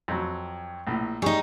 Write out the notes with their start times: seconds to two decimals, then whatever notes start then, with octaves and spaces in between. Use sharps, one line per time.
0.08 F2 F#3
0.87 A#1 A2
1.22 G3 D#4 G#4 C#6